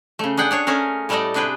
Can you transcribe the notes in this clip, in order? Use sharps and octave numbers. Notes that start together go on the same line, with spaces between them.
C#3 A3
D4 G#4 F#5 G5
D4 G#4 C#5
A3 C#4 G#4 A#4
A2 G3 A3 A4 D5 D#5
C3 D4 G#4 B4 G5